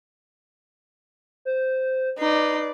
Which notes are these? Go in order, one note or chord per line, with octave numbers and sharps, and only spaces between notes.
C5
D#4 B4 D5 C7